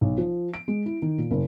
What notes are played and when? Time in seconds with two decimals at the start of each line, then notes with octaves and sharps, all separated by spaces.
0.01 B1
0.18 F3
0.54 D7
0.68 G#3
0.86 E4
1.02 D#3
1.18 A#2
1.31 F#1